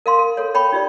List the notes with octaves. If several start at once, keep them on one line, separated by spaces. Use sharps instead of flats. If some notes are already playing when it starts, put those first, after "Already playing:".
A#4 F5 C6
A#4
A4 C#5
C#5 G5 B5 C#6
D#4 F4 G4 D5